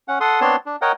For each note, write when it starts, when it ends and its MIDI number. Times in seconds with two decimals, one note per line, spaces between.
0.08 0.19 61
0.08 0.19 78
0.21 0.41 69
0.21 0.41 78
0.21 0.41 84
0.21 0.41 87
0.41 0.56 59
0.41 0.56 60
0.41 0.56 62
0.41 0.56 73
0.41 0.56 81
0.41 0.56 84
0.66 0.76 62
0.82 0.92 70
0.82 0.92 73
0.82 0.92 75
0.82 0.92 78
0.82 0.92 79